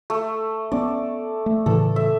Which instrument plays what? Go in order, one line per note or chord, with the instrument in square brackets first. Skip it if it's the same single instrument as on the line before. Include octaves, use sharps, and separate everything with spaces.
[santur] A3
[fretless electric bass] B3 C#4 [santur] D5
[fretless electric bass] A3
[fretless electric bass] A2 C#3 E3 [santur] A4
[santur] E5